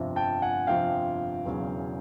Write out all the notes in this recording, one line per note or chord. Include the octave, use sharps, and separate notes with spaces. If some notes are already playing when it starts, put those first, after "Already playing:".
Already playing: G1 F2 C3 F3
G5 A5
F#5 G#5
G1 F2 C3 F3 F5 G5
E1 E2 C#3 F#3